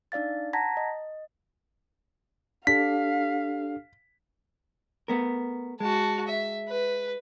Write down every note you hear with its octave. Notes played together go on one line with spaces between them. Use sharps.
D4 D#4 D5 F5 A6
F#5 A5 A#5 G#6 A#6 B6
D#5
D4 G4 A4 F5 B6
A3 B3 A#4
G#3 F#4 A5
E5
B4